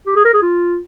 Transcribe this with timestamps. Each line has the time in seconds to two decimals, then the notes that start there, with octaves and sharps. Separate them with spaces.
0.07 G4
0.16 G#4
0.25 A#4
0.34 G#4
0.42 F4